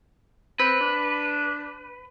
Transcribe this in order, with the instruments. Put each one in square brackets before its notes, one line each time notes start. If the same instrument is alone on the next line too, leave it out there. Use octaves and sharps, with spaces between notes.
[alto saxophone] C4 [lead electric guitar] B4
[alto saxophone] D4